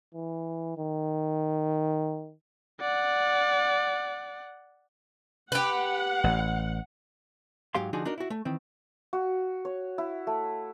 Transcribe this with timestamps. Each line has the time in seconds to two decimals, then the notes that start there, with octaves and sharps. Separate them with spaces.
0.14 E3
0.78 D#3
2.81 D5 F#5
5.52 G4 B4 F#5
6.24 A1
7.75 G#2 F#3 G4 F5 C6
7.93 D3 F3 D4 D#4 F#4 G#4
8.05 D4 D#4 F#4 A#4
8.18 E4 F#4
8.30 A3
8.45 D#3 E3 C4
9.13 F#4
9.65 C#5
9.98 E4
10.27 A3